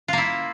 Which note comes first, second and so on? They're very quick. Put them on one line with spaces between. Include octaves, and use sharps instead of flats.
F4 A#3 E4